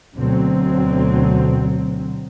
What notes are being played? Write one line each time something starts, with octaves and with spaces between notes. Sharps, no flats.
D2 B2 D3 F#3 C4